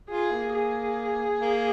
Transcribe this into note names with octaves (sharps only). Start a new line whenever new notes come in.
F4 G#4
A#3
G#4
A#3